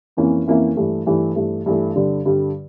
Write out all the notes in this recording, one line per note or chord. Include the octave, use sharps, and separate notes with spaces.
F2 E3 A#3 C#4 E4
F2 E3 A#3 C#4 E4
G2 E3 A3
G2 E3 A3
G2 E3 A3
G2 E3 A3
G2 D3 G3
G2 D3 G3